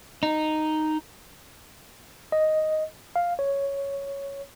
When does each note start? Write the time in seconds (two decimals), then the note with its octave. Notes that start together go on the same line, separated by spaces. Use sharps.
0.23 D#4
2.32 D#5
3.16 F5
3.39 C#5